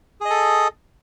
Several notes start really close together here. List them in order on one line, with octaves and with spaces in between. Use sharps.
G#4 D#5 A4